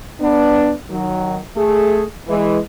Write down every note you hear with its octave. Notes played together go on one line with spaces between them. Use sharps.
B3 D4
D#3 F#3
A3 G#4
E3 G#3